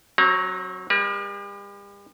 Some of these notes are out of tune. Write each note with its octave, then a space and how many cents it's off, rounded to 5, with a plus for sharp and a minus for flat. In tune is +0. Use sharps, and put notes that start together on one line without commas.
F#3 +0 C4 +40 A#5 +10
G3 +40 B4 -45